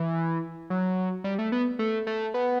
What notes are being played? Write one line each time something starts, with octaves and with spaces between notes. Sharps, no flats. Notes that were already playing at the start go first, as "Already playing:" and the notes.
Already playing: E3
F#3
G3
A3
B3
A3
A3
B3